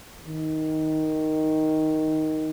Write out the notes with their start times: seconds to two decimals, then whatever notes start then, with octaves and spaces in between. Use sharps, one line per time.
0.27 D#3